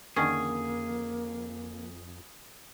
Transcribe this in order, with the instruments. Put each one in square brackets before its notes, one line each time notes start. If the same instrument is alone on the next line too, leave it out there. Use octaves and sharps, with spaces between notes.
[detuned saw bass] F2 [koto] D3 D#3 C#4 [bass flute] A#3 [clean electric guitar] G#4